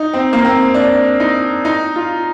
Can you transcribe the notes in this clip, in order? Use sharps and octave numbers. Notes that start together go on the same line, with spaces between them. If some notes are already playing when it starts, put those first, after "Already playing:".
Already playing: D#4
C4
A#3
C4
D4
D#4
D#4
F4